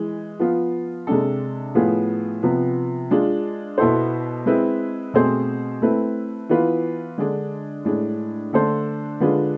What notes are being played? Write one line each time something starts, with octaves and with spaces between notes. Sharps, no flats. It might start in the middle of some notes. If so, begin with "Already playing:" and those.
Already playing: E3 G#3
F3 B3 F4
C3 G#3 D4 A4
A2 F3 B3 F4 G#4
C3 F3 B3
G#3 D4 F4
B2 B3 E4 A4 C5
G#3 C4 E4 B4
B2 A3 C4 G#4 C5
A3 C4 E4 B4
E3 B3 F4 B4
D3 G#3 D4
A2 G#3 D4
D3 A3 D4 A4 C5
D3 G#3 D4 F4 B4